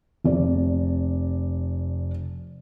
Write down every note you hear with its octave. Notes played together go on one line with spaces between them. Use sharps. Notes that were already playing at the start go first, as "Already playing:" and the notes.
F1 D5